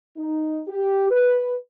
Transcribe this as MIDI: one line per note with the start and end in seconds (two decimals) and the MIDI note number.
0.17 0.61 63
0.67 1.10 67
1.10 1.54 71